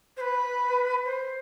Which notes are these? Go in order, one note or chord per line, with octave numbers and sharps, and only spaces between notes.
C5
B4
C5